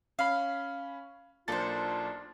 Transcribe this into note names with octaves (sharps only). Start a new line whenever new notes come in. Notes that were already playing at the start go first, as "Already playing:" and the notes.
C#4 F5 B5
B1 A#3 D4 F4 A4 C5 A6